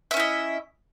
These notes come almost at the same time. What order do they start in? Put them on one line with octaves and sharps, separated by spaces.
E5 C#4 E4 D#5